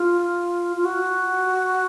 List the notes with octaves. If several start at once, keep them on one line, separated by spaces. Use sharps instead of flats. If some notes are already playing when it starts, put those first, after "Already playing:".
Already playing: F4
F4
F#4